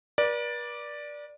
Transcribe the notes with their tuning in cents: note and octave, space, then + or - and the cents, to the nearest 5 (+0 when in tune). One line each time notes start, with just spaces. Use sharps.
B4 -45 D5 +0